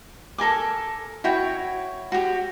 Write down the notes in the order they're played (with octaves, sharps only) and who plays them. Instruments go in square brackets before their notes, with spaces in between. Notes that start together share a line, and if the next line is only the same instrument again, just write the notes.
[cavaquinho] A4 A#4 G#5 D6
E4 F#4 C#5 G5
F#4 G4